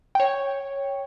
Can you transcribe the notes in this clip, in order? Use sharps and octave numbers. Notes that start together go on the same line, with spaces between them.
C#5 G5